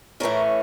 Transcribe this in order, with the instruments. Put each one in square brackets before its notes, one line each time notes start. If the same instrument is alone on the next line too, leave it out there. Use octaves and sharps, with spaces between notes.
[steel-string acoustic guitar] A2 E3 A3 C#4 A#4